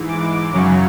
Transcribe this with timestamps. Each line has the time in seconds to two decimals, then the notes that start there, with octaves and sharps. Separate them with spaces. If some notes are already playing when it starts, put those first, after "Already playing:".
Already playing: G#2 E3
0.08 D6
0.53 F#2 C#3 F#3 C#6